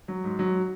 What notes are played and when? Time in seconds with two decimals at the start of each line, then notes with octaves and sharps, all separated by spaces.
0.08 F#3
0.24 G#2
0.39 F#3